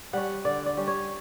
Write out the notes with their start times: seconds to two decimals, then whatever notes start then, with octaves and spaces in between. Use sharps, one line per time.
0.13 G3 C#4 F#5
0.45 D3 D5
0.66 D5
0.77 G3 C#4
0.88 C#5